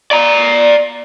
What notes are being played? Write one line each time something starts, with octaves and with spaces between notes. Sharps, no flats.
D5 A#5